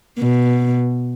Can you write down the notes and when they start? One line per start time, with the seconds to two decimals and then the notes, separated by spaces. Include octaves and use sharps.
0.19 B2